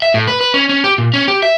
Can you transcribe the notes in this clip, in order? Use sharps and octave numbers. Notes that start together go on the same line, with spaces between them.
E5
A2
B4
B4
C#4
C#4
G4
A#2
C#4
G4
E5